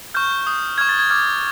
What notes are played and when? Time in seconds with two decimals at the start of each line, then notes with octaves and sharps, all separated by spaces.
0.14 C#6 F6 G6
0.47 D#6 G6
0.78 C#6 F6 G#6
0.89 A6
0.99 G#6
1.10 D6 F6 G#6